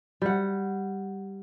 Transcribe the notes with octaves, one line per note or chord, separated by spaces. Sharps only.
G3 F#5